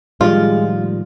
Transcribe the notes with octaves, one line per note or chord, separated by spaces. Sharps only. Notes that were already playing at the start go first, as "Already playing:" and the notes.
A2 D#3 F3 G3 G#3 F4